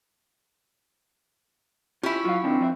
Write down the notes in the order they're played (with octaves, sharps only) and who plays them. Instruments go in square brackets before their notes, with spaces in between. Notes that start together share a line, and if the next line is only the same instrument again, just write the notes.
[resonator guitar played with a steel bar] C#4 E4 [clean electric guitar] F4 G4
[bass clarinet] F#3 [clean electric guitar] F4 F#4 F5
[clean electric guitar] D#2 D#3 D4 [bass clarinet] C4
[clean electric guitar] F3 D5 E5